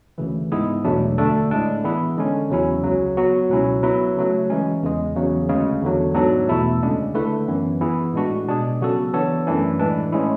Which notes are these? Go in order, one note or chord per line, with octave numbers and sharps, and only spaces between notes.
D2 C#3 E3
G#2 G#3 B3 E4 G#4
E2 B2 F#3 A3 D4
D2 D3 A3 D4 A4
A2 G#3 D4
E3 B3 E4 G#4 B4
D3 G#3 C#4
E2 C#3 F#3 C#4 E4
C#2 C#3 F#3
F#3 B3 F#4
C#2 B2 F#3 C#4 E4
F#3 B3 E4 B4
C#3 F#3 A3
E3 G#3 C#4
E2 C#3 G#3
E2 C#3 F#3
D2 C#3 G#3
E2 D3 F#3
G#2 F#3 B3 D4 A4
E2 B2 A3 E4 A4
D2 C#3 G#3 D4
D3 A3 E4 B4
F#2 E3 B3
E3 B3 E4 G#4
A2 G#3 D4 F#4
B2 G#3 D4 G#4
C#3 F#3 B3 F#4 A4
E3 B3 D4 A4 C#5
F#2 E3 A3 D4
A2 E3 G#3 D4
A2 G#3 C#4 E4